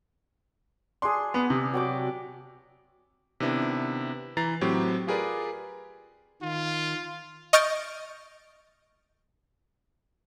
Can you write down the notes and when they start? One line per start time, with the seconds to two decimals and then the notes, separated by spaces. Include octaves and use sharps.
1.02 D4 G#4 C6
1.34 B3
1.50 C3
1.74 F#3 G5 D6
3.40 C3 D#3 B3 D4 E4
4.37 E3 A#5 A6 C7
4.61 A2 F#3 C4 G4
5.07 F4 G4 G#4 A#4 B4 D5
6.42 D#3 F4
7.53 D#5 C#6 F6 G6 A6 D7